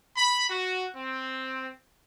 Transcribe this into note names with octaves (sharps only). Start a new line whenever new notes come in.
B5
F#4
C4